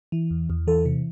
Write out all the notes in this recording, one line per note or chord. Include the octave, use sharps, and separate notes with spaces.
E3
E2
E2
E3 A4
C3